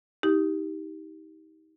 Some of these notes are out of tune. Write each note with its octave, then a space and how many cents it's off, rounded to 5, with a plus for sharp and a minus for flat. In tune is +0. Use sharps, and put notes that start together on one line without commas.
D#4 +30 G4 +0